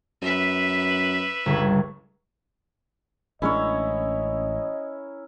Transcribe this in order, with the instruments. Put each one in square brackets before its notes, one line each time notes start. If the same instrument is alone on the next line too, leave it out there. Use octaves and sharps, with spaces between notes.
[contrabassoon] F#2 [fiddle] B4 E5
[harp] G1 C#2
[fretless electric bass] A1 G#3 D4 [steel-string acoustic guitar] C#4 [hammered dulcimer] E4 A#4 C#5 [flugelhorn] D#5